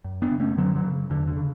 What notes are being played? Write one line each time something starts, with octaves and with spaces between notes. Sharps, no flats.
F#2
B3 D4
C#3
A3 C#4
F#2 D3 F#3
D3 F#3
C#3
E2 D3
D3
C#3